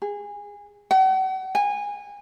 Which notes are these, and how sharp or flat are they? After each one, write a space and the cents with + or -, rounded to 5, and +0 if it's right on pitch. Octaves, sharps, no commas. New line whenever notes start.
G#4 -20
F#5 +40
G#5 -25